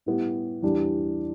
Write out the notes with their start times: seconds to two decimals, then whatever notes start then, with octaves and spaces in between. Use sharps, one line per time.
0.06 A2 G3 B3 E4 G4
0.62 E2 E3 G3 D4 G4